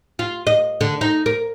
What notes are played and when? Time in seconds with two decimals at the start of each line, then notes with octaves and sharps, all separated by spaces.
0.19 F4
0.47 D#5
0.81 D3
1.01 D#4
1.26 A#4